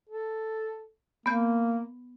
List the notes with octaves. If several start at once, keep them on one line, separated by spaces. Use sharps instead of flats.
A4
A#3 B3 G6